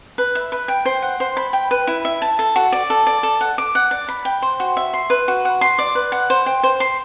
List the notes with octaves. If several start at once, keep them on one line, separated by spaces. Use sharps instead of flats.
B4
E5
B4
G5
C5
F#5
C5
B5
G5
B4
E4
E5
A5
A4
F#4
D5
A4
D5
A4
F#5
D6
F#5
D5
B5
G5
C5
F#4
E5
C6
B4
F#4
F#5
C6
D5
B4
F#5
C5
G5
C5
C6